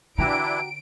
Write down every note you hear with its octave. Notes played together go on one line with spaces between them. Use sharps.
D3 E3 D4 E4 F#4 G4 A#5 D7